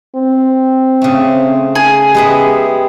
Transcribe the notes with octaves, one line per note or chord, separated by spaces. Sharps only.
C4
C#3 A3
G#4
G#3 B3 G4 E5